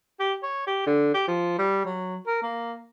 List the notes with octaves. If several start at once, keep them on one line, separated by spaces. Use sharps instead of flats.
G4
C#5
G4
D3
G4
F3
G3
F#3
A#4
A#3